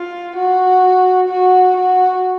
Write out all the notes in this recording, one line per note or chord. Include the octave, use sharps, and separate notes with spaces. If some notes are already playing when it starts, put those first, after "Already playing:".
Already playing: F4
F#4
F#4
F#4